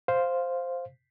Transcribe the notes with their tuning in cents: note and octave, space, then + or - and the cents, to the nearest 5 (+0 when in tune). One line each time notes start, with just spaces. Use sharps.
C5 +0 F5 +0